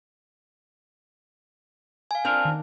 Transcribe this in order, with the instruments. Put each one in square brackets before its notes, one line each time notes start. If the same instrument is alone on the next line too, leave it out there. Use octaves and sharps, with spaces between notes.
[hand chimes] F5 G#5
[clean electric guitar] C4 F4 A#4 [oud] D4
[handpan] D#3